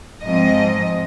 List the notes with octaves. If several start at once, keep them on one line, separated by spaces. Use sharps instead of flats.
G#2 F3 C4 D#5